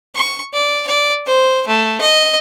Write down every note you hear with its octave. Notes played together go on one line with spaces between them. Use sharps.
C#6
D5
D5
C5
A3
D#5